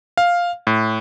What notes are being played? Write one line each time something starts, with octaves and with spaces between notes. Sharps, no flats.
F5
A2